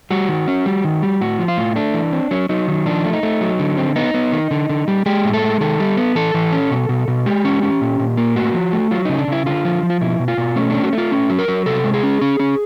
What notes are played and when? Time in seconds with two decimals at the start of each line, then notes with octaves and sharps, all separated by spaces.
0.11 G3 F#4
0.29 D#3
0.48 C#4
0.66 G3
0.84 D#3
1.02 G3
1.21 A2 F#4
1.39 F3
1.48 F4
1.57 A2
1.76 A3 D4
1.94 E3
2.12 C4
2.31 F#3 C#4
2.49 F#3 D#4
2.68 D#3
2.86 F3 D4
3.05 A3
3.13 D#4
3.23 A3
3.41 F#3
3.59 D3
3.77 C4
3.96 B3 D#4
4.14 B3
4.32 D#3
4.51 D3
4.69 D3
4.88 G3
5.06 G#3 G4
5.24 A2
5.34 A4
5.42 G#3
5.61 D#3 A4
5.80 G3
5.97 B3
6.15 E3 A4
6.34 E3
6.52 C#4
6.71 B2
6.89 B2
7.08 B2
7.26 G#3 G4
7.45 C#4
7.63 C#4
7.81 A#2
8.00 A#2
8.18 A#3
8.36 A2 F#4
8.54 F3
8.73 A3
8.91 F#3 F4
9.05 C#3 D#4
9.18 D4
9.28 C#3 E4
9.46 D3 F4
9.65 F3
9.83 F3
9.90 F4
10.01 B2 E4
10.19 B2
10.28 F4
10.37 B2
10.56 A3 C#4
10.70 C#4 D4
10.84 F#4
10.93 A3
10.98 F4
11.11 C#4
11.29 F#3
11.39 A#4
11.48 F#3
11.66 C3 A4
11.84 G#3
11.94 G#4
12.03 C#4
12.21 C#4
12.40 C#4